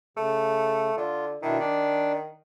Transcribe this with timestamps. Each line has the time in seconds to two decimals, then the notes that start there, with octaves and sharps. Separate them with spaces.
0.17 C#3 A3
0.97 D3 F4
1.43 B2 D#3 D4 E4
1.59 D4 D5